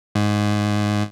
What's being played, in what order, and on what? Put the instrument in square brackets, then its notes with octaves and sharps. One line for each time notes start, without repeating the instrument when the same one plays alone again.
[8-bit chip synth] G#2